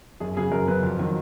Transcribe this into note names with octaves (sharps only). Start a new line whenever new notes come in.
F#2 G#4
C#3 F#3 G#4
F#2 A#4
C#3 F#3 B4
F2
D#3 F#3